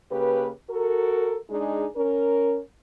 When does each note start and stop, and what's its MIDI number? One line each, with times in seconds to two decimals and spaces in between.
0.11 0.50 49
0.11 0.50 58
0.11 0.50 67
0.11 0.50 71
0.69 1.37 66
0.69 1.37 69
0.69 1.37 70
1.50 1.87 56
1.50 1.87 62
1.50 1.87 63
1.50 1.87 68
1.96 2.59 61
1.96 2.59 70